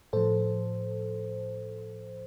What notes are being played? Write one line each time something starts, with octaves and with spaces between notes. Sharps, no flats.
A2 F3 A4 C5